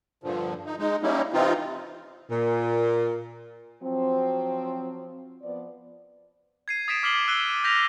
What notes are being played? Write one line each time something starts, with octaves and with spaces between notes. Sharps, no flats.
G2 A#2 D3 F3
D#4
G#3 D#4
G3 A#3 C#4 D#4 E4
C3 E3 C4 D#4 F4
A#2
F3 F#3 C4
F3 B3 D5
G#6 C7 D#7
D#6 A6 B6 D7 E7
D6 F6 B6 C7 F#7 G7
E6 F#6 B6 D#7 G7
F6 G6 A#6 B6 F7